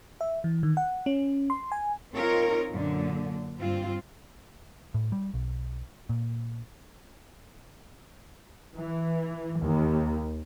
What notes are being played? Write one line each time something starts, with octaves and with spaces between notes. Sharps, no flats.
E5
E3
D#3
F#5
C#4
C6
G#5
C4 D#4 F4 A#4 C#5
F#2 A#2 D3
G2 C4 F4
A2
G3
B1
A#2
E3
D#2